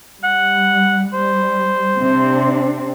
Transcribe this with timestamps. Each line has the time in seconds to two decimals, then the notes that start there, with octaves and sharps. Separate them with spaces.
0.23 G3 F#5
1.13 G3 C5
1.99 C3 C4 D4